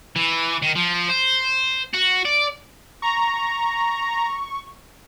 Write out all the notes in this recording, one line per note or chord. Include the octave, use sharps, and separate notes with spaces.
E3
D#3
F3
C5
F#4
D5
A#5 C#6